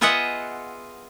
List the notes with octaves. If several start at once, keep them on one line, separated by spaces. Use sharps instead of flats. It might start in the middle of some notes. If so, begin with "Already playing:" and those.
B3 F4 G#4 D#5 E5 F#5